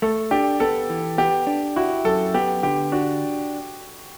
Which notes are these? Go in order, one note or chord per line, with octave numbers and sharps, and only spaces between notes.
A3 A4
D4 G4
B3 A4
E3
B3 G4
D4
E4 F#4
F#2 A4
B3 G4
D3 G4
D4 F#4